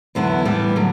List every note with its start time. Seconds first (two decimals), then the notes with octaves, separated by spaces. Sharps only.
0.15 E2 D3 F#3 B3 E4
0.45 A2 E3 G3 B3
0.76 D3 F#3